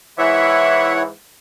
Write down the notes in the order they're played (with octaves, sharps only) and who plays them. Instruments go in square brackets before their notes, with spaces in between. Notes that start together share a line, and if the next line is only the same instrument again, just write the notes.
[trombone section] G#2 E3 [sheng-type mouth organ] E4 C#5 F#5 [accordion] E5